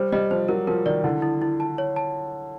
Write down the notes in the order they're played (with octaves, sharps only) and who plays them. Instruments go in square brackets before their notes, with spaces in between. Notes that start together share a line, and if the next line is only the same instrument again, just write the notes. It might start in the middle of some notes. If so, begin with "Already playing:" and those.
Already playing: [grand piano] G3 [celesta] C5
[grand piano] G3 [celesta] D#5
[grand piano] F3 [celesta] C5
[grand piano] F#3 [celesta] A#4
[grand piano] F3 [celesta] A#4
[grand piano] D#3 [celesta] D5
[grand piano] D3 [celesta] E4
[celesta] E4
E4
A5
C#5
A5